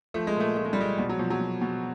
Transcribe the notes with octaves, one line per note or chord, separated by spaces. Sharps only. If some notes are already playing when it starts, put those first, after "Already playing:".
F3 A3
G#3
A#2 A3
F3 A3
G#3
G3
F3 G#3
B2 G3
F#3
B2 F3
F#3
B2
B2